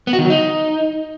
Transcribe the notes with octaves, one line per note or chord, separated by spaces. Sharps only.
B3
F#4
D#3
F#3
D#4